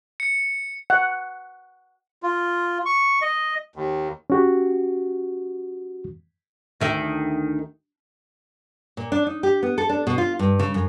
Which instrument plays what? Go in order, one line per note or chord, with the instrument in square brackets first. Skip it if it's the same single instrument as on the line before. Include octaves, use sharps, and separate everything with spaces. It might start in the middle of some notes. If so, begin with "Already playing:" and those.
[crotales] C#7
[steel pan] F#5
[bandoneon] F4
C#6
D#5
D#2
[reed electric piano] C#4 F#4 G4
[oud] D2 D#3 E5
[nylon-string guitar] A#2
D4
D#4
G4
B3
A4
D4
B2
F4
G2
C#3
F#2